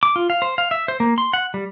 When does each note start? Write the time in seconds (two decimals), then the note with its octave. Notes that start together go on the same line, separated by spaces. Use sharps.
0.03 D6
0.16 F4
0.30 F5
0.42 C5
0.58 F5
0.71 E5
0.88 C5
1.00 A#3
1.18 C6
1.33 F#5
1.54 G3